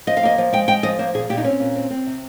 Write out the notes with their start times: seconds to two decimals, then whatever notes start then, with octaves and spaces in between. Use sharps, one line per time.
0.07 F3 D#5
0.17 F5
0.23 A#3 D#5
0.38 F3
0.53 G#3 G5
0.68 G#3 G5
0.83 F3 D#5
0.99 A#3 C5
1.14 A#2 G#4
1.29 A#2 G4
1.37 D#4
1.44 C4 C#4
1.60 A#2
1.76 C4
1.90 C4
2.06 C3